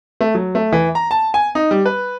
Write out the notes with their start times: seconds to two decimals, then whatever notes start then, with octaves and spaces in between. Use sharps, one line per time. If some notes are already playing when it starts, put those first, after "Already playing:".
0.21 A3
0.35 F#3
0.55 A3
0.73 E3
0.95 A#5
1.11 A5
1.34 G#5
1.55 D#4
1.71 G3
1.86 B4